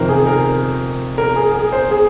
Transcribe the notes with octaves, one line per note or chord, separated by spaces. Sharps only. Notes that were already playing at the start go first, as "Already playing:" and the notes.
Already playing: F2 C3 D#3 A#4 C5
G#4
A#4
A#4
G#4
G#4
C5
G#4